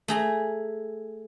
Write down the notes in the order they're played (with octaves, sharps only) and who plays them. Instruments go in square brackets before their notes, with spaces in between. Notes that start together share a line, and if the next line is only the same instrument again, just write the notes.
[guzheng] A3 G#4 A#5